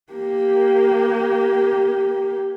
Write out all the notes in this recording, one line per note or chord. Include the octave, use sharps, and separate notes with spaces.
A#3 G4